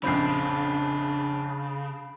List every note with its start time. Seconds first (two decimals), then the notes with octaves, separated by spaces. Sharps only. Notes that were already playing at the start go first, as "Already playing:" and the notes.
0.04 A#1 F2 C#3 C4 D4 B5 G6 C7